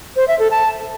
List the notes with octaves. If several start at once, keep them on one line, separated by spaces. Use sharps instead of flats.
C5
E5
A4
A5